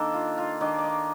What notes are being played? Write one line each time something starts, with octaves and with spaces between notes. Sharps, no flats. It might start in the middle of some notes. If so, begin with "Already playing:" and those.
Already playing: D#3 A#3 D4 A4
F4
F4
D#3 A#3 D4 D#5
D5
D#5